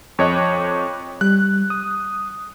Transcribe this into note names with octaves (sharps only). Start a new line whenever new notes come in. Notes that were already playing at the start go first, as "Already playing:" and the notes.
F2 C#5 D#5 C#6 D6 F#6
G3 F#6
D#6